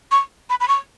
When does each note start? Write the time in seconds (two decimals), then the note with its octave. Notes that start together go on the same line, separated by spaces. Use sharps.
0.11 C#6
0.50 B5
0.60 B5
0.68 C#6